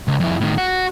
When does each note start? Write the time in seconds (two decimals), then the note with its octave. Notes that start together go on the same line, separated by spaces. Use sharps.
0.08 C#2
0.20 F2 E4
0.40 A2 D#3
0.58 F#4